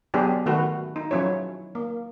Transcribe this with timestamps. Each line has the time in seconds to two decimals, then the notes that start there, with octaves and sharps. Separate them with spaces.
0.14 F#3 B3 D4 G4 G#4
0.46 D#3 A3 F#4 B4
0.96 D#4
1.11 F3 F#3 C#4 E4 C#5
1.75 A#3